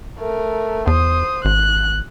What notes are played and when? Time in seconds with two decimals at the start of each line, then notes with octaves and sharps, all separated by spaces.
0.19 A3 A#4
0.87 E2 C5 D#6
1.45 G#1 F#6